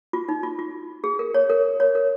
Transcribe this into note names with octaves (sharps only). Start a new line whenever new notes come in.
F4
D#4
F4
F4
G#4
A#4
C#5
A#4
C#5
A#4